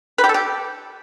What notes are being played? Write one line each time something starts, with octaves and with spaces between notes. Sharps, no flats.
B4
G4
A4
G4